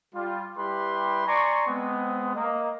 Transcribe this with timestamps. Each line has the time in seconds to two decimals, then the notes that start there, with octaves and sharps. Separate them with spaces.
0.14 G3 F4
0.57 G3 E4 G4 B4 B5 C6
1.26 D5 G#5 A#5 C6 C#6
1.67 G#3 B3 C4
2.35 A#3 D#5